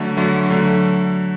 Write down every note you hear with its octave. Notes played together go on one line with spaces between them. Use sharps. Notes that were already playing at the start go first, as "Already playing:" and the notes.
Already playing: D3 F#3 A3
D3 F#3 A3
D3 F#3 A3